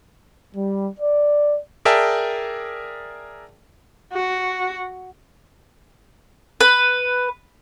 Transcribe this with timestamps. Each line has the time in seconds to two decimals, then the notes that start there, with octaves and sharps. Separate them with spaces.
0.55 G3
1.00 D5
1.85 G#4 A#4 D5 E5 G5 A5
4.13 F#4
6.61 B4